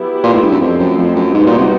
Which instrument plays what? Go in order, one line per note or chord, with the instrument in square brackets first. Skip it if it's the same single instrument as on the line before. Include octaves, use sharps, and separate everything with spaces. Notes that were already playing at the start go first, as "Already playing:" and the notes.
Already playing: [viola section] F#3 B3 E4 G4
[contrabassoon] A#2
A2
G2
F#2
[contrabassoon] F2 [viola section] F3 A3 C4
[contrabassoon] F#2
F2
F#2
[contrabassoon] G#2 [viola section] G3 B3 D#4 F#4
[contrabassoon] A#2
C3